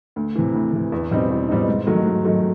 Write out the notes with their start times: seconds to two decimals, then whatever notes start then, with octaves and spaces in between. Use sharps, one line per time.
0.16 D2
0.35 C3 E3
0.54 D2
0.73 C3 E3
0.92 E2
1.11 B2 G3 C4 D#4
1.30 E2
1.49 B2 G3 C4 D#4
1.68 G#2
1.86 D#3 F#3 A3
2.06 G#2
2.24 D#3 F#3 A3